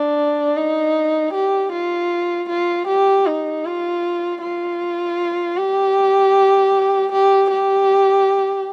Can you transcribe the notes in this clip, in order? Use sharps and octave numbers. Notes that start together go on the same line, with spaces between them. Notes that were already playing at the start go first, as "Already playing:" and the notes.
Already playing: D4
D#4
G4
F4
F4
G4
D#4
F4
F4
G4
G4
G4